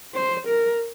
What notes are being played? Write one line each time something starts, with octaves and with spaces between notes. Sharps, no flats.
C5
A#4